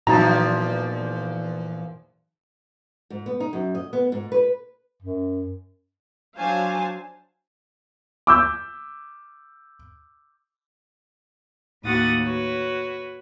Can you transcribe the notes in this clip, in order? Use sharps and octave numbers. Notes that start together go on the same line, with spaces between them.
E2 A#2 F3 F#3 D#4 A5 A#5 A6
G#2
B3
D#4
F#2
D#5
B3
G#2
B4
F#2
F#3 D4 C5 F5 G#5 A5
D6 E6 G6
D#2 A2 F#4 F#5 D#6 A6
F#4 B4 C#5